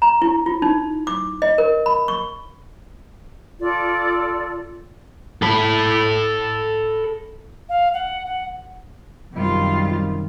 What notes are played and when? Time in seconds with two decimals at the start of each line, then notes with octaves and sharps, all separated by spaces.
0.02 A#5
0.22 E4
0.46 F4
0.62 D#4
1.07 D6
1.42 D#5
1.58 A#4
1.86 B5
2.08 C#6
3.60 F4 A4 D5
5.42 A4 B5
7.69 F5
7.94 F#5
8.26 F#5
9.34 F#2 C3 D#3 G3 F4